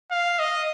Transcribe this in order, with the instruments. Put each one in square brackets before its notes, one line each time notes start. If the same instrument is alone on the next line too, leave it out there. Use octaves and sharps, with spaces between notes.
[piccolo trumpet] F5
D#5